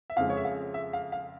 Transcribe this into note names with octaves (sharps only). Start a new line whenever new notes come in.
E5
F2 C#3 F3 G#3 F5
C#5
E5
F5
E5
F5
F5